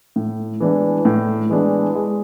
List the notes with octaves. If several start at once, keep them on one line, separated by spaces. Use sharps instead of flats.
A2
E3 G#3 B3 D4
A2
E3 G#3 B3 D4
G#3